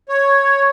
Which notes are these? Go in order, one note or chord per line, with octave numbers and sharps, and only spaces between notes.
C#5